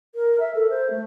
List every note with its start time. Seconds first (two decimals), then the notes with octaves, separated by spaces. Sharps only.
0.15 A#4
0.40 E5
0.55 A4
0.70 C5
0.91 A3